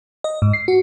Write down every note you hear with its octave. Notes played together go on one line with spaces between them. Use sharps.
D#5
G#2
C7
F#4